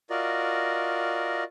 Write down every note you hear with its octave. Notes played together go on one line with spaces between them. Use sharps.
F4 F#4 A#4 D5 D#5